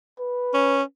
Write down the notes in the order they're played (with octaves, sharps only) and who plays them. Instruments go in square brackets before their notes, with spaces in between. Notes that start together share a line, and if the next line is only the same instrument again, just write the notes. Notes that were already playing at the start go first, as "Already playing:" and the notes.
[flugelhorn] B4
[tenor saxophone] C#4